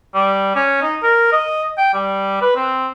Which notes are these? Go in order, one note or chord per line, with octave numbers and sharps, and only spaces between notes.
G3
C#4
D#4
A#4
D#5
G5
G3
B4
C4